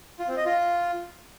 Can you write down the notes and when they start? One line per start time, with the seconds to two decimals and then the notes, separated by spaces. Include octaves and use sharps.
0.19 F4
0.28 C4
0.37 D#5
0.46 F4